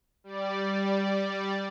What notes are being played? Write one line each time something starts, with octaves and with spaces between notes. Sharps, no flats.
G3 D5